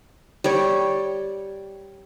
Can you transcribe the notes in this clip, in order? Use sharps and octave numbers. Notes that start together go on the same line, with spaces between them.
G3 C#5